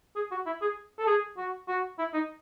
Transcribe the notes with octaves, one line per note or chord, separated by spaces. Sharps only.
G#4
F#4
E4
G#4
A4
G#4
F#4
F#4
E4
D#4